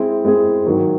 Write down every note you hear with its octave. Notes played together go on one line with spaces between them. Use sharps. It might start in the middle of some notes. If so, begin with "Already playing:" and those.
Already playing: G#3 C4 E4 G#4
G#3 C4 E4 G#4
G#2 D#3 F#3